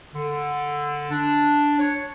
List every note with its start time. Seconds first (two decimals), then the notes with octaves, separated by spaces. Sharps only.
0.14 D3
1.10 D4
1.79 C#5